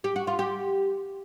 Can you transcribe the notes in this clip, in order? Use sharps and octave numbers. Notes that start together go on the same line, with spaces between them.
G4
F#4
F4
G4